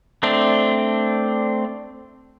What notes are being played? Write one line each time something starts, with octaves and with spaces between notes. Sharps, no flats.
A3 C4 D4